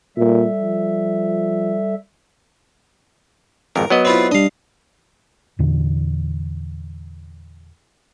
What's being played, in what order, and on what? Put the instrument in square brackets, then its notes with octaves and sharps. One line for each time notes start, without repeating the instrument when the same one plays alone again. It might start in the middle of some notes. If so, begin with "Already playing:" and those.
[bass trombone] A#2 [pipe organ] G3 A4 E5
[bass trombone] F3
[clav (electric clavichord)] G#1 F2 [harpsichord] A#4
[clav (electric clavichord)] F#3 B3 D#5
[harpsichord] C4 E4 F4
[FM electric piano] G3 D4 [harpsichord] D#5 F5
[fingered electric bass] E2 A#2 D3 E3